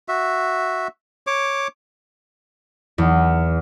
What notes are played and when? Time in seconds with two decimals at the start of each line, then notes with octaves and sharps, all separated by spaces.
0.08 F#4 E5
1.27 C#5 D6
2.98 E2